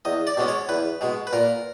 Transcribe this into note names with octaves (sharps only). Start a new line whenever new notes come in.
E2 D#5
D5
B2 G#3 C#4
C#5
E2 B4
B2 G#3
B4
A#2 A#4